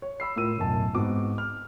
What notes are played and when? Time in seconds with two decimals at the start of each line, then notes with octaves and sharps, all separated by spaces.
0.02 C#5
0.20 B5 E6 C7
0.36 A2 F4 A#4 E6 D#7
0.58 D1 B1 F#2 A5
0.94 G#2 B3 C4 F#4 D6
1.38 F6